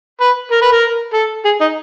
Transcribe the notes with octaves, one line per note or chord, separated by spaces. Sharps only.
B4
A#4
B4
A#4
A4
G#4
D#4